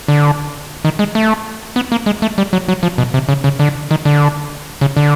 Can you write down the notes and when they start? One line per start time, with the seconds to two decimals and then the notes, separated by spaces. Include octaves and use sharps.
0.08 D3
0.85 D#3
0.99 G#3
1.15 A3
1.76 B3
1.92 A#3
2.06 G#3
2.22 A3
2.38 G3
2.53 F#3
2.68 F#3
2.83 F3
2.98 B2
3.14 C3
3.29 C#3
3.44 C#3
3.59 D3
3.91 D#3
4.05 D3
4.81 C#3
4.97 D3